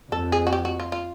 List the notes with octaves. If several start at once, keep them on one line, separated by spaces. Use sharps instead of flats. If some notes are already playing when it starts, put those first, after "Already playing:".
F2 A4
G#4
F#4
G4
F#4
F4
F4